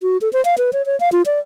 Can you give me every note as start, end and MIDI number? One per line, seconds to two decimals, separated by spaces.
0.02 0.18 66
0.21 0.31 69
0.33 0.43 72
0.45 0.55 77
0.58 0.71 71
0.73 0.85 73
0.86 0.98 73
1.00 1.09 77
1.12 1.22 65
1.26 1.39 74